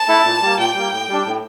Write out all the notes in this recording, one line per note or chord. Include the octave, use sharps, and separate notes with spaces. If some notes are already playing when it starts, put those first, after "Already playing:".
Already playing: A5
A3 E4 A4
A#2
G3 A#3
A#2 G5
G3 A#3
A2
G3 D4
A2